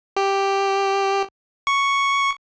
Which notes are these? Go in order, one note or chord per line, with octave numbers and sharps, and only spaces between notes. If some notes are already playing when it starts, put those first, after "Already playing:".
G4
C#6